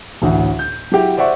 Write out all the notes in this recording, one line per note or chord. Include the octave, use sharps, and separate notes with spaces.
A1 D2 A2
G6
F#3 E4 F#4 G4
C5 D5 E5 F#5 C#6